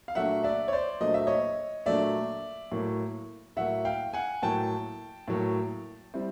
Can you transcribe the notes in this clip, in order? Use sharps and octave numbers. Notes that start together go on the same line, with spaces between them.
F5
A#2 F#3 A3 D4 E5 F#5
D5 E5
C#5
C5 D5
A#2 F#3 A3 D4 D#5
E5
C#5 D#5
A#2 F#3 A3 D4 D5 E5
A2 F#3 A#3
A2 F#3 A#3 E5 F#5
F5 G5
F#5 G#5
A2 F#3 A#3 G5 A5
A2 F#3 A#3
G3 C4 E4